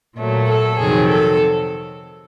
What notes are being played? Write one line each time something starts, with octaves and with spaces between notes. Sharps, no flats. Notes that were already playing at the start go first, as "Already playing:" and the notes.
A#2 F#3 A3
A4
F2 C3 D#3 F#3 G#4
A4